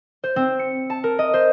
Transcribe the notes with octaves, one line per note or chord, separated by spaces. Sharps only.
C5
C4
C#7
A5
A#4
D#5
C5